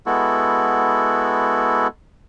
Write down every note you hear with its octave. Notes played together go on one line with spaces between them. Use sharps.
G#3 B3 E4 F#4 A4